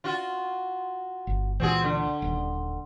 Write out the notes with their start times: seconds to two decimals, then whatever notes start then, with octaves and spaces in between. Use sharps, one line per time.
0.04 F4 F#4
1.27 G1
1.60 C#2 A#2 E3 C4 F#4 G#4
1.84 D3
2.22 D#1